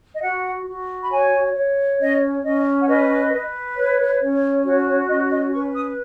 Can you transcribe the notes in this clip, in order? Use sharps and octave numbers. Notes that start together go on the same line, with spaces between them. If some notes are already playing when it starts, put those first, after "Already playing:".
D#5
F#4 F#5
F#4
B5
C#5 G#5
C#5
C#4 D#5
C#4 D#5
F#5
B4 D#5
B4
C#5
C#4
F#4 C#5
C#5
C#4 D#5
D#5
B4 C#6
D#6